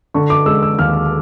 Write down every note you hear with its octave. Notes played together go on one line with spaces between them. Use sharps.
D3 C#6
D6
G#3 E6
E6
D#2 F6